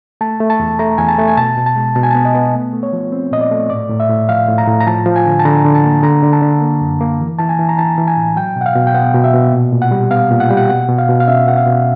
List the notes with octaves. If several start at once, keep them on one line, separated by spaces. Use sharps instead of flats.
A3 A5
A3
A5
E2
A3 A#5
E2 G#5
A5
A3
G#5
B2 A5
B2
A5
G#3
B2 A5
G#5
B3 A5
D#5
B3
A3
A3
C#5
F3
C4
A#2 D#5
D5
A3
A2 D5
A2
E5
A2
F3 F5
A2
A#5
A2
A#5
F3 A5
F3
G#5
D3
A5
D3 A#5
D3
A5
A#3
D3 A#5
D3
A5
D3
A#3
F#2
A#3
E3
E3 A5
G#5
E3
A#5
E3 A5
E3
G#5
A2
F#3 G5
B2
F#5
F5
B2
G5
B3 F#5
B2
E5
B2
A#2
A#2
F#5
G3
B3 F5
A#2
F#5
G3 G5
F#5
B2 F#5
B2
F5
B2
F5
C#4 E5
B2 F#5
F5
B2